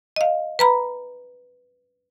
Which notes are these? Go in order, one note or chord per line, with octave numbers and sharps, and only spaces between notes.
D#5 F5
B4 A#5 B5